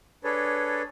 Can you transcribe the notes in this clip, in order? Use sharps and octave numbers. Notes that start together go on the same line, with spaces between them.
D4 G#4 A4 B4 C#5